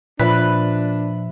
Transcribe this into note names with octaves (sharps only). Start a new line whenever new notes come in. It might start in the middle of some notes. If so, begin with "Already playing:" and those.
A#2 F3 D4 B4 E5 B6